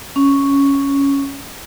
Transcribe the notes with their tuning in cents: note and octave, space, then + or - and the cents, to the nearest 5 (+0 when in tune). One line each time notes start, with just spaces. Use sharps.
C#4 +5